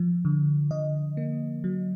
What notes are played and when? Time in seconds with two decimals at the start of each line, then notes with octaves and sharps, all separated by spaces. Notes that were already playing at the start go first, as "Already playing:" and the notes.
Already playing: F3
0.25 D3
0.71 D3 D#5
1.17 A#3
1.64 F#3